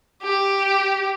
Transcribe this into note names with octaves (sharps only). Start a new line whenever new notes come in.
G4